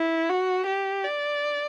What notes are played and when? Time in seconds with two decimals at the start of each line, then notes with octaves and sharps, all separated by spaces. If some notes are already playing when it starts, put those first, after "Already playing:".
Already playing: E4
0.30 F#4
0.66 G4
1.04 D5